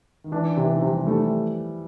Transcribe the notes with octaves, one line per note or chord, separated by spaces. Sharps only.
D#3
E3 D4
D#3
C3
E3
C3 F3
G3
G3 A3